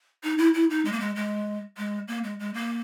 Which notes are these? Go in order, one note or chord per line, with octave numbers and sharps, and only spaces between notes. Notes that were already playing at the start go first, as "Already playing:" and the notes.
D#4
E4
E4
D#4
G#3
A#3
G#3
G#3
G#3
A#3
G#3
G#3
A#3